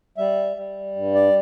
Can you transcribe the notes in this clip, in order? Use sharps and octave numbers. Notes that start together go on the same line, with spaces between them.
G3 E5
G3
G2
D5